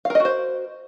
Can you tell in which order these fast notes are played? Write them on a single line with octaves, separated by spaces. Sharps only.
F5 A#4 D#5 F#4 C5